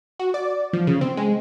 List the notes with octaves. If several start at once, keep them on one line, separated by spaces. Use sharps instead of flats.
F#4
D5
F3
C#3
C4
G#3